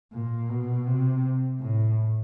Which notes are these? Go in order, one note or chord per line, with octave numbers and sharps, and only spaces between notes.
A#2
B2
C3
A2